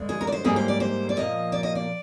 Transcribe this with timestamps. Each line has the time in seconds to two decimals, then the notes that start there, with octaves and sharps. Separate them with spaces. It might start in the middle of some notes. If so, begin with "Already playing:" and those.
Already playing: G2 D3 G#3
0.09 G#4
0.21 A#4
0.27 D5
0.32 C5
0.44 G#2 G3 A#3 G#4
0.56 C5
0.68 D5
0.80 C5
1.09 D5
1.16 A#2 F3 A#3 D#5
1.52 D5
1.63 D#5
1.75 D5